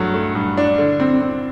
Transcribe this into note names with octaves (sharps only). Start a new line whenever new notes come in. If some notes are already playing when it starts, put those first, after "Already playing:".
Already playing: G2 F#3 A3
A3
G2
D4
D3
C4
C4